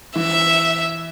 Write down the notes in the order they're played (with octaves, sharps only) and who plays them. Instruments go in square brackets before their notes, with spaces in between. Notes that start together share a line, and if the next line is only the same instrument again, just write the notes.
[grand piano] E3 [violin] E5